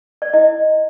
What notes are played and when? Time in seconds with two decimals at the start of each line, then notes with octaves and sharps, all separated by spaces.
0.22 D5
0.33 E4 D#5